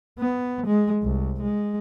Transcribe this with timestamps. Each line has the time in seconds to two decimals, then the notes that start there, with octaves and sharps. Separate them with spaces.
0.19 B3
0.67 G#3
1.03 C2
1.42 G#3